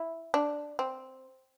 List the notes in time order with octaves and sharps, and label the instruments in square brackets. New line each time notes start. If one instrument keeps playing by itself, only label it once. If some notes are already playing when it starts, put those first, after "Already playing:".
Already playing: [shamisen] E4
D4
C4